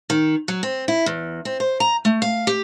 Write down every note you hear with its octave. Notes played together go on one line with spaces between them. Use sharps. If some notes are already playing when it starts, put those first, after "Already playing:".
D#3
F#3
C4
E4
E2
C4
C5
A#5
A3
F5
G4